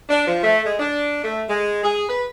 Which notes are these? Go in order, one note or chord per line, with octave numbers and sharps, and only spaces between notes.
D4
F3
A3
G#3
D4
A3
G#3
G#4
B4